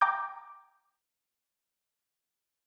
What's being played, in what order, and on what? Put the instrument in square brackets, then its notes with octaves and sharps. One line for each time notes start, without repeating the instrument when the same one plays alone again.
[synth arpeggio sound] G5 A#5 D6 G6